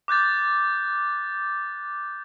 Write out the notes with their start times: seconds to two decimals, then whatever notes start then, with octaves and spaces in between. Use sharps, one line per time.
0.08 D6 F#6 G6 A6